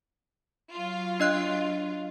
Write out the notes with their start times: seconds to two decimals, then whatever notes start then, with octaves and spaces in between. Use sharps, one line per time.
0.74 F#3 F4
1.20 D4 D#5 F#6